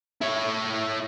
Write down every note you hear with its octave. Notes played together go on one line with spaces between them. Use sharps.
E4 C#5